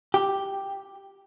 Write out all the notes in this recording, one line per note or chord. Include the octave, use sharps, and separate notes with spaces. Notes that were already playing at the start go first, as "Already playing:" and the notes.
G4